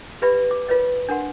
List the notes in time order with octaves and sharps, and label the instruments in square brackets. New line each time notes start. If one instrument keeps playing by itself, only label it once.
[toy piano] G4 B4 D5 E5 B5
D6
F4 A#4 B4 C#5 D#5
D4 A#4 F#5 C6